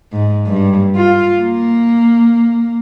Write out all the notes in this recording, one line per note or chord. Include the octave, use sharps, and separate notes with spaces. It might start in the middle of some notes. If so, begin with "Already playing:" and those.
G#2
G2
F4
A#3